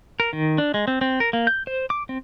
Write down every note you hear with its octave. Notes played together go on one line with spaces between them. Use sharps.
A#4
D#3
D4
G#3
C4
C4
A#4
A#3
G6
C5
D6
C4